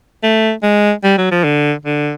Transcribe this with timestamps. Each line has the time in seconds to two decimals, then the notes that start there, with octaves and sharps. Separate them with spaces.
0.23 A3
0.63 G#3
1.04 G3
1.18 F#3
1.31 F3
1.44 D3
1.85 D3